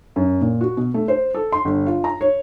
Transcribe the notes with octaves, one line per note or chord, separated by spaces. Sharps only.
F#2
A#2
F#4
B2
A3
C5
A4
C6
G1
F4
A#5
C#5